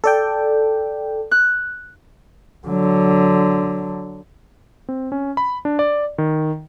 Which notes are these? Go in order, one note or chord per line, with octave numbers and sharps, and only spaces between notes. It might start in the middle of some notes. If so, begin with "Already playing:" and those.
A4 D5 G5
F#6
D3 F#3
C4
C#4
B5
D4
D5
D#3